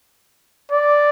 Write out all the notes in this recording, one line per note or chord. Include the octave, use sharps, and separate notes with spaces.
D5